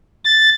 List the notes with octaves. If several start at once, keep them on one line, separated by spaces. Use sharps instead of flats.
A6